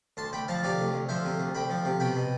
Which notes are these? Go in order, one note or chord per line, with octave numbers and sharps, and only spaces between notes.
D2 A5 C6
D2 G5 B5
F3 F5 A5
C3 D5 F5
D2
D2
F3 C5 E5
C3
D2
D2 G5 B5
F3
C3
B2 G5 B5
B2